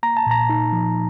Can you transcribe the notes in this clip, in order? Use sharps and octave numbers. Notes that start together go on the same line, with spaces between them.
A#3 A#5
A5
A#2 A#5
D#4
F3